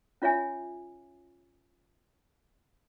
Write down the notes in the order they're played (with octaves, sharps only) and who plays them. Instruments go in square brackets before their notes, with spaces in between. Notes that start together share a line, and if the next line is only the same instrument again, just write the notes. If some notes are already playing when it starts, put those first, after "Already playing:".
[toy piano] C#4 F4 C#5 E5 G#5